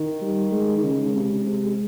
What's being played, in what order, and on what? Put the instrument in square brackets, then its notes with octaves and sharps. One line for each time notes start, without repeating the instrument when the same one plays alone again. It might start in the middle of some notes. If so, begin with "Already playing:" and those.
Already playing: [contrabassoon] D#3
[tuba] G3
G#3
[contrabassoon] D#3
[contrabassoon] C#3 [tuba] G#3
[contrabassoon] C3
C3